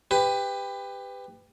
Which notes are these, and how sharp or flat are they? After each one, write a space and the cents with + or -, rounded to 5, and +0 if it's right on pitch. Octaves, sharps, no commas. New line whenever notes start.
G4 +20 B4 +25